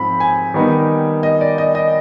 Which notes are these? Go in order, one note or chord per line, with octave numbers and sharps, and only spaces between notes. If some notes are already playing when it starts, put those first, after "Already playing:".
Already playing: G#2 F3 C4 B5
G#5
D#3 G3 B3 D#4
D#5
D5
D#5
D#5